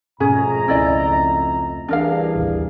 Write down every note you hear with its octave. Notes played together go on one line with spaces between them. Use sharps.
F2 G#2 B2 A3 C#4 G#4 A#5
C#2 C#4 E4 D5 D#5
E3 G3 D4 G#4 A#4 F5
A1 D#2 C3